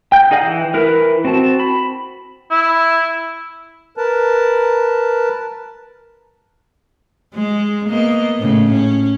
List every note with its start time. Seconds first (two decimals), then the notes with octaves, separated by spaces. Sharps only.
0.12 G5 G6
0.31 D#4 G#4 D5 F5 F#5
0.43 E3
0.74 E3 E4 A#4 B4
1.25 C4 F#4 A5
1.60 B5
2.51 E4
3.97 A#4 B4 A5
7.34 G#3
7.89 A#3 B3 D#5
8.39 A2 C#3
8.72 C#4